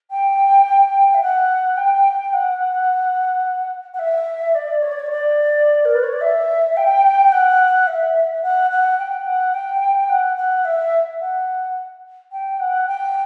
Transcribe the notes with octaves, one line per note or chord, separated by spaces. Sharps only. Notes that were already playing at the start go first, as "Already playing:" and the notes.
G5
E5
F#5
G5
F#5
F#5
E5
D5
C#5
D5
C#5
D5
A#4
B4
C#5
D5
E5
G5
F#5
E5
F#5
F#5
G5
F#5
G5
F#5
F#5
E5
F#5
G5
F#5
G5